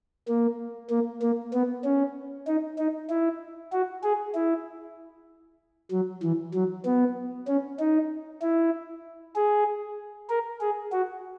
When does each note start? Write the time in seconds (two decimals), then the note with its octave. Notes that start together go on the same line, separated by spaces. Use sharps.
0.28 A#3
0.90 A#3
1.22 A#3
1.53 B3
1.84 C#4
2.47 D#4
2.78 D#4
3.10 E4
3.72 F#4
4.03 G#4
4.35 E4
5.91 F#3
6.23 E3
6.54 F#3
6.85 B3
7.48 C#4
7.79 D#4
8.42 E4
9.36 G#4
10.30 A#4
10.61 G#4
10.92 F#4